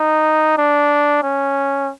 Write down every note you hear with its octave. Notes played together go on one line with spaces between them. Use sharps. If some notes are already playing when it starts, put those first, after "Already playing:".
Already playing: D#4
D4
C#4